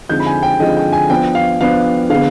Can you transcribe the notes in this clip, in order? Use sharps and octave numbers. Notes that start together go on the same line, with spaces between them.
D3 F3 G#3 C4 D#4 G6
B5
G#5
G5
D3 F3 G#3 C4 D#4 D#5
G5
G#5
F3 B3 D4 G5
F5
F3 B3 D4 F5
D3 G#3 B3 F5